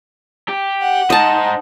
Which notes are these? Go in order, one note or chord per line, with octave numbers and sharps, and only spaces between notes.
G4
F#5
D#4 C5 D#5 A5